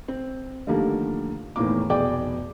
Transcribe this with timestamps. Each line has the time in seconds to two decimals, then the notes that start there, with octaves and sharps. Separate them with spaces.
0.08 C4
0.67 D3 D#3 F3 G3 A3 A#3
1.56 E2 A2 D#3 A#3 D6
1.89 F1 B2 G#4 D5 G5 D6